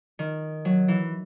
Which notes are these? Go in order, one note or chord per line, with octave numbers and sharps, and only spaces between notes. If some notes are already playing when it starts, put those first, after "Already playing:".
D#3
F#3
E3